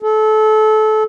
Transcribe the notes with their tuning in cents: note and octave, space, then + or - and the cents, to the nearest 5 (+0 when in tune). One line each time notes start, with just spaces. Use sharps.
A4 -25